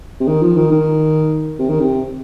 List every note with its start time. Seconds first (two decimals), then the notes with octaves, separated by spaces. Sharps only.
0.20 C3
0.28 D#3
0.42 F3
0.57 D#3
0.71 D#3
1.59 C3
1.69 D#3
1.80 C3